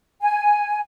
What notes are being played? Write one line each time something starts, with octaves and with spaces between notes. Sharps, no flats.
G#5